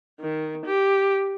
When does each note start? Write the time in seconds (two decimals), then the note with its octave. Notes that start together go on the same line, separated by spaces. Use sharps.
0.20 D#3
0.66 G4